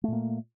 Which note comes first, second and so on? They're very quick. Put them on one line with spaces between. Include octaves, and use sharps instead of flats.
A3 A#2 A#3